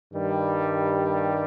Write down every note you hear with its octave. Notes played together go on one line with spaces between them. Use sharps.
G2 D#3 G3